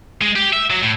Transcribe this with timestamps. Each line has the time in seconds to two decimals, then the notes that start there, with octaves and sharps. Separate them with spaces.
0.21 G#3
0.36 G4
0.53 E5
0.70 F#3
0.83 A2